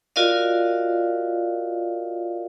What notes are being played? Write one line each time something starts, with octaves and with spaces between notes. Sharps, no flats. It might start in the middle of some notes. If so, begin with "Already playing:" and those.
F4 F#4 A#4 D5 D#5 F5